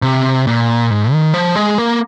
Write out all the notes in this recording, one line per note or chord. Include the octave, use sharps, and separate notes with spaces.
C3
A#2
G#2
D#3
F3
G#3
A#3